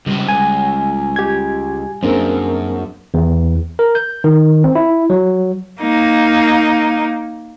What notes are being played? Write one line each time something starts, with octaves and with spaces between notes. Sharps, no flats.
C#2 C3 G3
C#2 G#5
G4 G#6
F#2 A#3 C4 D4 G#4 A#4
E2
A#4
G6
D#3
C4
E4
F#3
A#3 D#4